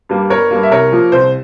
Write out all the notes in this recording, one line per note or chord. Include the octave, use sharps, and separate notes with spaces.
G2 G3 A#3
G1 A#4 C#5
G2 G3 A#3
E5
C2 A#4 C#5
A#2 F3 A#3
C2 C5